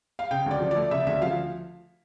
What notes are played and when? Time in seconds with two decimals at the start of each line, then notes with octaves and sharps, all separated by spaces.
0.19 F5
0.31 C#3 G5
0.46 D2 D5
0.61 F3
0.71 D5
0.76 A3
0.91 C#3 E5
1.00 D5
1.07 D2 E5
1.22 F3 F5